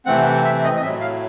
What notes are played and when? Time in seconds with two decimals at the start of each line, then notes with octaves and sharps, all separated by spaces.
0.06 C3 E3 A3 C4 F#5
0.45 E5
0.64 D#5
0.77 D#5
0.82 A2 F#3 A3 E5
1.01 F5